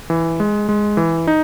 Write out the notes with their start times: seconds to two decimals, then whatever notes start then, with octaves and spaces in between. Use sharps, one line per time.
0.10 E3
0.40 G#3
0.69 G#3
0.97 E3
1.27 D#4